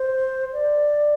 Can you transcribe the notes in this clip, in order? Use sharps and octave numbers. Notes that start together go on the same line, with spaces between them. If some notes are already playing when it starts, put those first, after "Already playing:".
Already playing: C5
D5